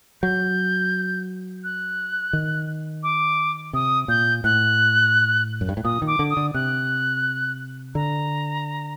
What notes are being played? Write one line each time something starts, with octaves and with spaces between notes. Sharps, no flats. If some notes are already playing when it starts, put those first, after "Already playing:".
F#3 G6
F#6
D#3
D6
C3 D#6
A#2 G6
A2 F#6
F#2
G2
A2
A#2 D#6
D#3
D6
D3
D#6
D3
C3 F#6
D3 A#5